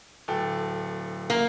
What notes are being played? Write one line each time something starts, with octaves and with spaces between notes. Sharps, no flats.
D1 A4 G5
A#3